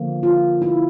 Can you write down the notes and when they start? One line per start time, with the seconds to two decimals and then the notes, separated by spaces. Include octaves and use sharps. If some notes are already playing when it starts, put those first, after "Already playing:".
Already playing: D3 F3 A#3
0.23 F4
0.62 E4